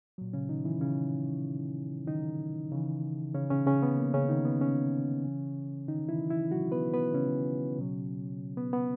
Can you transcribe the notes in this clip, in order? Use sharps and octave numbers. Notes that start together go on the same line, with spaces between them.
A#2 F#3
C#3 C#4
D#3 D#4
E3 E4
C#3 C#4
D#3 D#4
C#3 E3
C#3 C#4
C#3 C#4
C#3 C#4
B3
A#3
C#3 C#4
D#3 D#4
B3
C#3 C#4
C#3 E3
D#3 D#4
E3 E4
E3 E4
F#3 F#4
B3 B4
B3 B4
C#3 C#4
B2 F#3
B3
B3